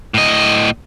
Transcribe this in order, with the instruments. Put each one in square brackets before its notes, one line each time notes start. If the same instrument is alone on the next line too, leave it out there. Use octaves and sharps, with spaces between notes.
[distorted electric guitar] A2 D#5